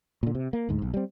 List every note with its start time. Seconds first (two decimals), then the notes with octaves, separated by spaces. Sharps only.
0.23 A#2 D3
0.35 C3
0.53 A#3
0.69 D2 G#2
0.82 B1
0.94 G3 C4